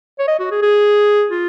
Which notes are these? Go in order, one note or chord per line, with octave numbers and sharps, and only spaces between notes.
C#5
D#5
F#4
G#4
G#4
F4